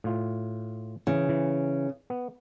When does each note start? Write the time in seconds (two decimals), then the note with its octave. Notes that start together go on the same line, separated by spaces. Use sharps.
0.04 A2 F4
1.07 C#3 E3
1.29 E3
2.10 B3